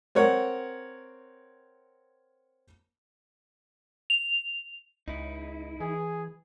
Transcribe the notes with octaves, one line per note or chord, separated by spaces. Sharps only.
C4 A#4 C#5 F#5
F7
C#2 D#4 E4
E3 G#4